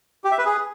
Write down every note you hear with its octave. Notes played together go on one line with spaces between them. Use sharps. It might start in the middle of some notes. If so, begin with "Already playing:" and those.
G4
E5
B4
G#4